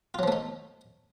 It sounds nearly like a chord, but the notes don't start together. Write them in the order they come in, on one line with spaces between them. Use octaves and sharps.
F4 F#3 F3 A3 D#4